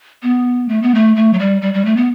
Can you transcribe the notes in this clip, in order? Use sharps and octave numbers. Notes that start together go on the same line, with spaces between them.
B3
A3
B3
A3
A3
F#3
G3
G3
G3
A3
B3